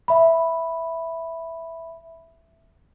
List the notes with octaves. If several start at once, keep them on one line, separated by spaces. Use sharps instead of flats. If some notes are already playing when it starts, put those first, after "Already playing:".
E5 B5